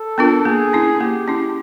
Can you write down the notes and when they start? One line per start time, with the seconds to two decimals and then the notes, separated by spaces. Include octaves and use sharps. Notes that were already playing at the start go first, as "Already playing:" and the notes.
Already playing: A4
0.18 B3 D4 F4 A#4
0.45 A#3 G#4
0.73 C#4 E4
1.01 A#3 G4
1.28 C#4 E4